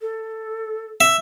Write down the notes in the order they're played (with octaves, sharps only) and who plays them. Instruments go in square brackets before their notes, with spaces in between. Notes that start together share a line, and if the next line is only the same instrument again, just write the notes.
[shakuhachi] A4
[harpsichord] E5